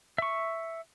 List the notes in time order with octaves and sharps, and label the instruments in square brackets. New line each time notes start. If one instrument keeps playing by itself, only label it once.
[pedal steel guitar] E5 C#6